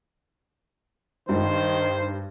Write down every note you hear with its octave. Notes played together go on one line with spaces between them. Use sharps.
G2 D#3 C5